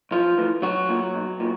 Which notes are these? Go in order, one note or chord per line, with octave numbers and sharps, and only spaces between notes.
B1 F3 F4
A2 E3
B1 F#3 F#4
A#2
B1
A#2